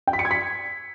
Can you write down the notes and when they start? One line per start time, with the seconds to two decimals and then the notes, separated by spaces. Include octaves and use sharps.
0.07 G5
0.13 B6
0.19 C#7
0.25 G#6
0.31 B6